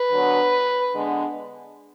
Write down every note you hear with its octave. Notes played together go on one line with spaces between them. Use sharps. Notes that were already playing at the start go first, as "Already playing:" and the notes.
Already playing: B4
D3 F#3 B3
D3 G#3 B3